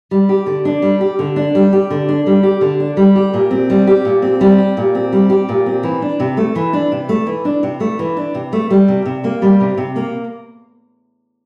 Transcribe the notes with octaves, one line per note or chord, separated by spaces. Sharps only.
G3
G4
D3
D4
G3
G4
D3
D4
G3
G4
D3
D4
G3
G4
D3
D4
G3
G4
A#2
C4
G3
G4
A#2
C4
G3
G4
A#2
C4
G3
G4
A#2
C4
E3
D4
C3
A3
E3
D4
C3
A3
E3
D4
C3
A3
E3
D4
C3
A3
G3
C3
C3
A#3
G3
C3
C3
A#3